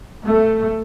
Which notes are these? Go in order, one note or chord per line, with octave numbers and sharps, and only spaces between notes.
A3